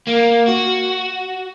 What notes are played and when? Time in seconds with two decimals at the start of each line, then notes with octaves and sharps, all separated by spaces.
0.07 A#3
0.47 F#4